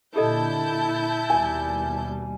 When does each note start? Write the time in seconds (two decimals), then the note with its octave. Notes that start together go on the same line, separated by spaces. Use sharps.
0.16 A#2 D3 E4 G4 A4 D#5 A5 G6
1.30 D#2 B2 G3 G#5